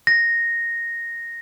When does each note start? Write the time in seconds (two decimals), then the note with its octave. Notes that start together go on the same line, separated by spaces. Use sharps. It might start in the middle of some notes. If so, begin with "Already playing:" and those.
0.07 A#6